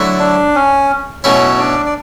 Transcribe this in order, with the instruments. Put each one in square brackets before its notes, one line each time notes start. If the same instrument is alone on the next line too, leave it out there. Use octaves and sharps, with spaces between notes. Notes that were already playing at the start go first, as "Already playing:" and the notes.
Already playing: [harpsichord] D3 F#3 A3 E4
[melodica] D4
C#4
[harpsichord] B2 A3 C#4 E4 [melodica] F#3 F#4
[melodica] D4 D5
D5